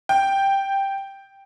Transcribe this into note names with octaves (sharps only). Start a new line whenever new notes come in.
G5